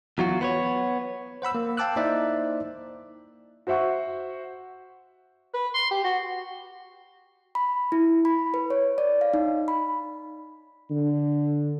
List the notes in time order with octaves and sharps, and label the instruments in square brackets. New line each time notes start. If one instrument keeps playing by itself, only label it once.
[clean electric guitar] E2 F#3 F4 F#4
B3 C5 C#5
[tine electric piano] C5 F#5 B5 E6
A#3
F5 G5 A5 D6 E6 F#6
A#3 D#4 E4 C5 D5 E5
[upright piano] F#4 C5 E5 F#5 C#6
[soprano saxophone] B4
C6
G4
F#4
[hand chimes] B5
E4
B5
B4
C#5
D5
F5
D#4
B5
[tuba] D3